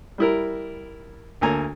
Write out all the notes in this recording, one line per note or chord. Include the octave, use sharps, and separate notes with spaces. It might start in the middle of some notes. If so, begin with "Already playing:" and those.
G3 E4 A#4
D2 A#3 A4 G#5 A#5